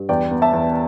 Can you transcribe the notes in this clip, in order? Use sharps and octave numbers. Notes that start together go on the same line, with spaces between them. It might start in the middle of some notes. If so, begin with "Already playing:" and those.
Already playing: G2
E2 D5 G5
B3
E5 A5
E2